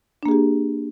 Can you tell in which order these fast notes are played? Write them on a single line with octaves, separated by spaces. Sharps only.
D4 A#3 G#4 G4